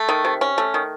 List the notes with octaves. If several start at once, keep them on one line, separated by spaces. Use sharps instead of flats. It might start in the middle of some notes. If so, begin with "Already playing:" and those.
Already playing: A3
D#3
C3
C#4
A3
D#3